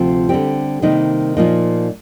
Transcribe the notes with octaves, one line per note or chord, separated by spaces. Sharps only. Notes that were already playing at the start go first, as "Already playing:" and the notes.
Already playing: D2 C3 F3 C4 F4
D3 G3 C4 G4
C3 D#3 G3 A#3 D#4
A#2 F3 A#3 D#4